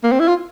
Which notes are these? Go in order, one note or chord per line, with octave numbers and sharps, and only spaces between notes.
A#3
C4
E4
F4